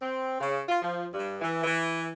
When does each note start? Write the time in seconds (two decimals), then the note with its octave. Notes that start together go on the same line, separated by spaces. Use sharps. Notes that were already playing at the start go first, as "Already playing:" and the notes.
0.02 C4
0.41 C#3
0.69 F4
0.82 F3
1.13 G2
1.42 E3
1.63 E3